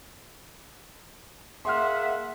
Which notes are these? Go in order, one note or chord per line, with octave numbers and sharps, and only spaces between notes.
A#3 G#4 E5 F#5 C6 F6